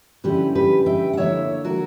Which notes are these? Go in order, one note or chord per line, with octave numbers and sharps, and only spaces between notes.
D3 G3 C#4 E4 G4 B4
G4 B4
E5 G5
F#5
D3 A#3 E4 C#5 E5
F#4 A#4